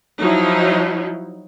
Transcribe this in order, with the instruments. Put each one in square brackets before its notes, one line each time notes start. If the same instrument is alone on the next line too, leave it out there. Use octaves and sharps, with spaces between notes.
[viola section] F3 F#3 D#4 E4